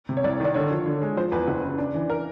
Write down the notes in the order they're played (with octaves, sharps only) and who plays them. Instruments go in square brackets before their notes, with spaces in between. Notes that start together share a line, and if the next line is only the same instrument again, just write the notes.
[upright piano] C3
[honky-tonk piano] C#5
[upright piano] C2 [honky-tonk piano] D5
[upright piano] D#3 [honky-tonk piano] D5
[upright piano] D3 [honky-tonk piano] C#5
[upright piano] F3
D3
G#3
[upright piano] F3 [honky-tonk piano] C5
[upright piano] E2 [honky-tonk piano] B4
[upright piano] F#1
C#3
D4
E3
[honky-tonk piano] A#4